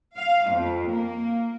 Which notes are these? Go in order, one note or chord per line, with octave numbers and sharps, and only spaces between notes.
F5
F2
A#3